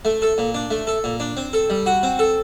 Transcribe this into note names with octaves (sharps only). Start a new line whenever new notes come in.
A3
A4
A#2
D4
A3
A4
A#2
D4
C4
A4
G3
F#4
C4
A4